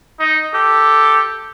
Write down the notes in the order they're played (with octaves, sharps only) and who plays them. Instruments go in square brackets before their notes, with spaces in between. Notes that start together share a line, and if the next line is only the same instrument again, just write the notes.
[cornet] D#4
[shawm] G4 [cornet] A4